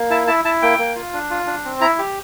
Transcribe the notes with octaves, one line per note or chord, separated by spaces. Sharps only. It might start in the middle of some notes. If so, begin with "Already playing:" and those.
Already playing: A#3
E4 A5
E4 A5
E4 A5
A#3 G5
A#3
F4
D4
F4
D4
C4
E4 A#5
G4